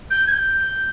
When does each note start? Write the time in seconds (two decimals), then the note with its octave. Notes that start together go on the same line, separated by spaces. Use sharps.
0.11 G6
0.27 G#6
0.32 G6